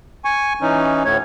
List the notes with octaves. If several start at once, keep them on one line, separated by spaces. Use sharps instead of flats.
G#5 C#6
E3 C#4 D#4
D2 A2 A3 C#5